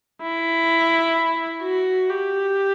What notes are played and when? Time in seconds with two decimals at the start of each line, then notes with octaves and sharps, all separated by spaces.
0.22 E4
1.62 F#4
2.10 G4